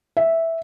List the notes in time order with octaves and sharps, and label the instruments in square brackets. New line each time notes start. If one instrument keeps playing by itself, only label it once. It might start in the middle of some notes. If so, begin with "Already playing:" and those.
[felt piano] E5